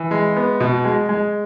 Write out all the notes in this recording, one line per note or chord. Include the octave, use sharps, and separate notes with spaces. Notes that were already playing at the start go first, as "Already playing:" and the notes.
Already playing: E3
G#3
B3
B2
G#3
G#3